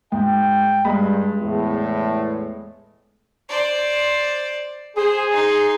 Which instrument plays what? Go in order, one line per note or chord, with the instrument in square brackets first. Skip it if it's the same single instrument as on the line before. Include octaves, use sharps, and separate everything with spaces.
[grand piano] G#2 [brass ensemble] G5
[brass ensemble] G2 [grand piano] G#3 B5
[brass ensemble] E2 A2
[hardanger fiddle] C5 D5
[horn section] G#4 [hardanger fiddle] C5
[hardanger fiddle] D#4 C6